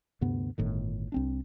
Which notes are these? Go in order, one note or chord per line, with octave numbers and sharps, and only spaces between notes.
D2 G2 C3 B3
G1 A2 D#3
C2 C4 D4